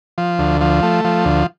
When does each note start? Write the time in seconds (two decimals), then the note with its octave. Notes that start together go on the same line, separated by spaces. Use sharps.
0.18 F3
0.39 D2
0.61 F3
0.83 A3
1.05 F3
1.25 D2